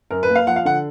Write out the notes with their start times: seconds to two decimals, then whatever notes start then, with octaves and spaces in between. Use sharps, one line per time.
0.11 F#2 A#4
0.23 B4
0.30 A#3
0.35 F5
0.47 F3 F#5
0.56 F5
0.65 D3 F#5